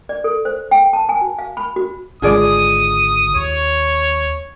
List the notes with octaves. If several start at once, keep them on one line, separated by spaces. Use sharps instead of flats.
D5
A4
C5
G5
A5
G#5
F#4
F5
B5
F#4
G#1 D3 G#3 F4 G#4 D5 D#6
D#2 C#5